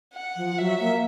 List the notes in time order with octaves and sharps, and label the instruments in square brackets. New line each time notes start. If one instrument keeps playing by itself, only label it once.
[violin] F#5
[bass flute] F3
[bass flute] F#3 [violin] E5
[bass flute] A#3